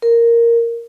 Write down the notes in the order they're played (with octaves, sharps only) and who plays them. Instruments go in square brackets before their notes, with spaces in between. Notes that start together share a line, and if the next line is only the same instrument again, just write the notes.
[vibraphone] A#4